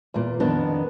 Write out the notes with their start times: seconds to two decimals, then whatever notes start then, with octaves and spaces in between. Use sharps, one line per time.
0.14 E2 A#2
0.40 F2 D#3 B3 D4